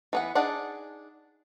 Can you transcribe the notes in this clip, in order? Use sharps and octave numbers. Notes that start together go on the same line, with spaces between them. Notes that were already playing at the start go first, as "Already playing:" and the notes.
E3 B3 F#5
D4 D#4 G#4 D5 F#5